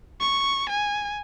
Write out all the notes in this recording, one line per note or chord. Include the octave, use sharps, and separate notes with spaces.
C#6
G#5